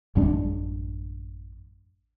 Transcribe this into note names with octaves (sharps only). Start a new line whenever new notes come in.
A1 F#2 G#3 D4